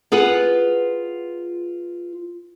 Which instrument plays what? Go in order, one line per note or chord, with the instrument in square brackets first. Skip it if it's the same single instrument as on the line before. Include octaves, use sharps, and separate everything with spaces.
[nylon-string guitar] F4 G#4 B4 F#5